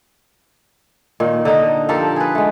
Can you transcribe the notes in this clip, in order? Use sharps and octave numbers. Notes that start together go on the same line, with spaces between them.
A#2 D#3
D3 D#4 D#5
F3 G4 A4 A#4
G#4 B4
G#3 A3